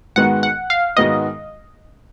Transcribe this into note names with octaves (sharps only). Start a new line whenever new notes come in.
G#2 D#3 G#3 B3 F#4 F#5
F#5
F5
G#2 D#3 G#3 B3 F#4 D#5